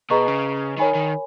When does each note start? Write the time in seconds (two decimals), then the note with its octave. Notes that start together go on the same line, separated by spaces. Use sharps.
0.10 B2 G#4 B4 D#5 A#5 C#6
0.28 C#3
0.79 D#3 A#4 C#5 G#5 B5
0.95 D#3